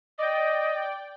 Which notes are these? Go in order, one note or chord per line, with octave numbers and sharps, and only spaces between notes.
D5 D#5 G5